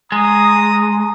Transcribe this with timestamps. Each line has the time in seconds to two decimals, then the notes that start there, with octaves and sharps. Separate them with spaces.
0.12 G#3 A#5 D#6